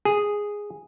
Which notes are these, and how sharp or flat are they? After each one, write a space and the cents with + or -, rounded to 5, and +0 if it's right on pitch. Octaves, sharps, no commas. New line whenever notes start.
G#4 -5